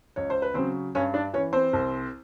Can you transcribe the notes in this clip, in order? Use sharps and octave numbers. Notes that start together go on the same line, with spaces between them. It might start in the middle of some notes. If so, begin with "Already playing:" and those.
C#2 C#5
C5
B4
C#3 F#3 C4 C5
G2 C#4 C#5
D4 D5
E3 C#4 C#5
C4 C5
C2